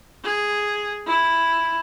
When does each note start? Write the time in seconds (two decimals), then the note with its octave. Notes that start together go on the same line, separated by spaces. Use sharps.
0.24 G#4
1.07 E4